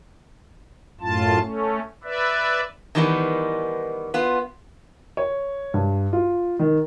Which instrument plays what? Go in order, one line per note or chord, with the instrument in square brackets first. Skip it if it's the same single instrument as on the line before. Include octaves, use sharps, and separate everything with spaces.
[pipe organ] F#2 A2 F4 A5
A3 C#4
B4 D5 E5
[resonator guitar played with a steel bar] D#3 E3 G3 B3 D#4
B3 F4
[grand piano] C#5
G2
F4
D#3